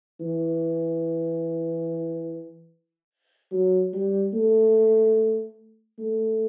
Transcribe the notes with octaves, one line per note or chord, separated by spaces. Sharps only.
E3
F#3
G3
A3
A3